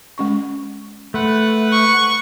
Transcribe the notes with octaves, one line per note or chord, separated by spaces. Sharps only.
G#3 C#4 C#6
A3 B4 F#5 C6
C#6